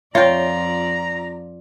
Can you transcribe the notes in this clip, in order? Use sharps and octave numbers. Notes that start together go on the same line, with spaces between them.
F2 F4 C#5 D5 G5 A#5